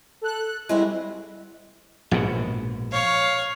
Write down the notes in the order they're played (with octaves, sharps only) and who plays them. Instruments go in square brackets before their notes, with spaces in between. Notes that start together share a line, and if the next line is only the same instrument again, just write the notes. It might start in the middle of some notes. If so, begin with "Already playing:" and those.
[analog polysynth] A4 F#6
[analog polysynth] G3 E4 [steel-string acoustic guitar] G#3 C4 F#4
[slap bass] A#1 G#2 B2
[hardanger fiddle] C#5 F5